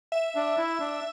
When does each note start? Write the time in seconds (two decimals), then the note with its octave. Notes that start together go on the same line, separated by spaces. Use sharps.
0.12 E5
0.36 D4
0.58 E4
0.80 D4